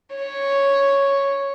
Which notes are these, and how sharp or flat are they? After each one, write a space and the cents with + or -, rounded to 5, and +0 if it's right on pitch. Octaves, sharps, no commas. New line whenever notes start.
C#5 +0